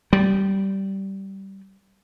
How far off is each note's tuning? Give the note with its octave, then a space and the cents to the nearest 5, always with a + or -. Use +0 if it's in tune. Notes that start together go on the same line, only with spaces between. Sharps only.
G3 -15